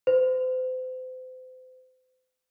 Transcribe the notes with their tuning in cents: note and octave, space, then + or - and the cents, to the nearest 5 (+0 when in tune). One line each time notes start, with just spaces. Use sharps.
C5 -35